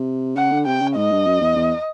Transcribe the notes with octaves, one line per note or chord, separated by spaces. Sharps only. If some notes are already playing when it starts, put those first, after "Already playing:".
Already playing: C3
C#3 F#5
D3
C3 G5
C#3
G#2 D#5
G2
F#2
E2
E2